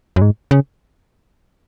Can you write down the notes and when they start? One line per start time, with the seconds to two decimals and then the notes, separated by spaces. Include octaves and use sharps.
0.16 F#2
0.22 G#2
0.51 C#3